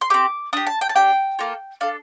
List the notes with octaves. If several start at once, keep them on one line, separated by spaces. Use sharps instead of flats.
C6
C4 G4 D6
D4 G4 D#6
A5
G5
A5
D4 G4 G5
A#3 F4 A4
D4 A4 F5